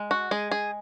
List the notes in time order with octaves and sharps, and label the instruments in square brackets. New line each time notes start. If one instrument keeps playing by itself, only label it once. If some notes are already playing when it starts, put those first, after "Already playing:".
Already playing: [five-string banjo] G#3
F#4
G#3 G#4
G#4